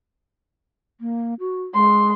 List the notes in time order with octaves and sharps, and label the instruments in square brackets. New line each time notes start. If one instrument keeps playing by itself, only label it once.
[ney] A#3
F#4
[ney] G#3 [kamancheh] C6